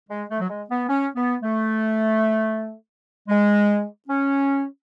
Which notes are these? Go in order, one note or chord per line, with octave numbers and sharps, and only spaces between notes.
G#3
A3
F#3
G#3
B3
C#4
B3
A3
G#3
C#4